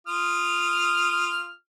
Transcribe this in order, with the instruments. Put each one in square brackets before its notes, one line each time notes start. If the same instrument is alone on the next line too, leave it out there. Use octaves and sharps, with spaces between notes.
[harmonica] F4 D#6 F6